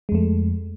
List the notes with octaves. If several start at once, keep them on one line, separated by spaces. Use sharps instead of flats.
F2 G#3 A3